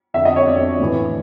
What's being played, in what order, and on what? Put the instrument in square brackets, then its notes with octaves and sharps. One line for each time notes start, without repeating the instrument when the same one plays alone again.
[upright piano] F2 D3 E5
D#5
C#5
F2 D3 D5
A2 E3